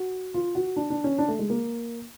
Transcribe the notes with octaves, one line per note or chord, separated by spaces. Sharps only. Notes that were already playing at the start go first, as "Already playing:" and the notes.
Already playing: F#4
F4
F#4
D4
D4
C#4
D4
A3
G#3
A#3